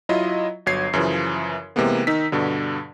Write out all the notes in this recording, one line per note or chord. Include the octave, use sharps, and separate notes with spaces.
F#3 E4 F4 D#5
G1 F#3 C#5 G#6 C7
F#2 C#3 E3 F3
C3 E3 G#3 A#3 B3
D#3 D#4 E6 B6
G2 B2 D3